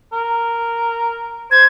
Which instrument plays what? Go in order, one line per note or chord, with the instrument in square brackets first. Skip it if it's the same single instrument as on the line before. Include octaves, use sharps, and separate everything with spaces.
[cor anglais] A#4
[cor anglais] C5 [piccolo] G#6